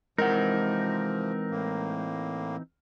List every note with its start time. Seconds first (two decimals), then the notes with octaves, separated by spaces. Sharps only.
0.18 C3 E3 F3 G#3 C4 D#4 A#4 F#5
1.51 A2 A#3